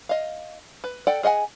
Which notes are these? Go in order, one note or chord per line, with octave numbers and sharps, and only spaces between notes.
D#5 F5
B4
A4 D5 F#5 G5
G#4 D#5 F#5 G#5